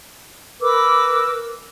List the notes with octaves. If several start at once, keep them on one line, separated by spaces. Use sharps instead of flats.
A#4 B4 D6 E6